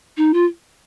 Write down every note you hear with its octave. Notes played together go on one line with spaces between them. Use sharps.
D#4
F4